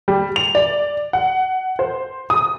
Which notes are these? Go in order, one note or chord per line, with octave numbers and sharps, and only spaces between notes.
G3
F7
D5
F#5
C5
D#6